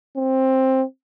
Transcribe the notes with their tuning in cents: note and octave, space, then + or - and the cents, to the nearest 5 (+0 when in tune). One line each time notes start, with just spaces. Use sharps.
C4 +10